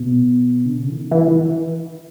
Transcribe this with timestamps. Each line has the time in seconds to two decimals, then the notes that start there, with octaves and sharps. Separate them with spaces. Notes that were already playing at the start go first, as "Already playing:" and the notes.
Already playing: B2
0.65 D3
0.81 C#3
0.90 E3
0.96 D#3
1.11 E3